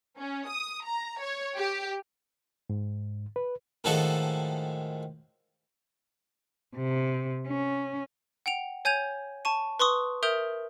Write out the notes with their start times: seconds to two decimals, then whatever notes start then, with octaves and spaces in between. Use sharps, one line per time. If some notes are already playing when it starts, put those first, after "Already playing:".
0.17 C#4
0.48 D#6
0.85 A#5
1.19 C#5
1.59 G4
2.70 G#2
3.36 B4
3.84 A2 D#3 F3 G#3 F#4 A4
6.76 C3
7.47 C#4
8.46 F#5 G5 D7 F7
8.85 C#5 G#5 G6 G#6 D#7 F7
9.45 A5 C#6 D#7
9.80 B4 C6 C#6 D#6
10.23 A#4 E5 D#6 G6 D7 F7